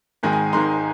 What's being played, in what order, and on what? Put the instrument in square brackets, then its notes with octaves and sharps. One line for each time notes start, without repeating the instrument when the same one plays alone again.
[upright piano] G#1 G#2 D#3 G#3 D#4 G#5
G#5
G#1 G#2 D#3 G#3 D#4 C6